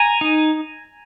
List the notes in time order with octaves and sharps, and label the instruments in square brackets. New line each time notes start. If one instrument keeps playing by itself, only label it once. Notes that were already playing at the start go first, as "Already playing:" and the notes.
Already playing: [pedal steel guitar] G#5 A#5
D#4